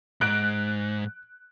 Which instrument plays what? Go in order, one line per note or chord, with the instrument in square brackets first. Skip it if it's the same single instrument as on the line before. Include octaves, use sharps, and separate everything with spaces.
[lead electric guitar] G#2 [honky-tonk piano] F#6 D7